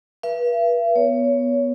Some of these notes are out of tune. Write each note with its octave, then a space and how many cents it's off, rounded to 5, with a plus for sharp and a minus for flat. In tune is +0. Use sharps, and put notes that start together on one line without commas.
B4 -40 E5 +45
B3 +0 C#5 +25